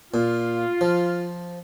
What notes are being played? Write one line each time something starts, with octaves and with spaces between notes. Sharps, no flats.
A#2 F4
F3